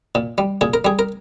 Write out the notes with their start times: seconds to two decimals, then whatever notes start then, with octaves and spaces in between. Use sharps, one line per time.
0.15 A#2
0.38 G3
0.61 A#2 G#4
0.74 A#4
0.85 G3 G#4
0.99 A#4